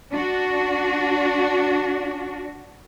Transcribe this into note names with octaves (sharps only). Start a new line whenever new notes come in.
D4 F#4